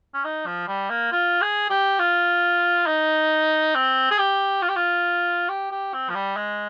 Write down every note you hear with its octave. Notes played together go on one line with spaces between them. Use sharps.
C#4
D#4
F3
G3
A#3
F4
G#4
G4
F4
D#4
C4
G#4
G4
F4
G4
F4
G4
G4
C4
F3
G3
G#3